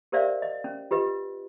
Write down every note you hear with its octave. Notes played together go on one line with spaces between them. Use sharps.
G4 A#4 C5 D5 E5 F5
D#5
C#4
F4 G4 B4 D#5